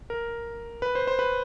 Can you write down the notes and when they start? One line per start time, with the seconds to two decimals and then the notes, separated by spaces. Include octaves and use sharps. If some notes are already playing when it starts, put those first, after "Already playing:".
0.10 A#4
0.82 B4
0.95 C5
1.07 C5
1.19 B4